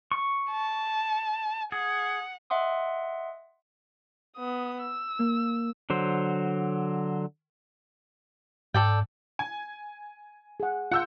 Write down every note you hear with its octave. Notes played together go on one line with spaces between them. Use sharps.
C#6
A5
G#4 F#5
D#5 E5 F#5 C6 D#6
B3 D#6
E6
A#3
D3 F#3 C5
G#2 A4 D5 G5
G#5
G#4 F#5
F4 F#5 E6 G6